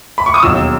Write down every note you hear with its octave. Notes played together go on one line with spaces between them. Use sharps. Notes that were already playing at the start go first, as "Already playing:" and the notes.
B5
C#6
D#6
E1 D#2 D#3 F#3 E6